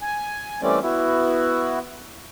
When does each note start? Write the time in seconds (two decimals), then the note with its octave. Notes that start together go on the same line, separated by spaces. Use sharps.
0.01 G#5
0.62 E3 G3 A3 C4 C#4 D5
0.83 B3 E4 F#4